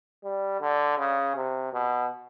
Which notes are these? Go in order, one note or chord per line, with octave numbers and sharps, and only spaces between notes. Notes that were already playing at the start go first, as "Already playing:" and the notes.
G3
D3
C#3
C3
B2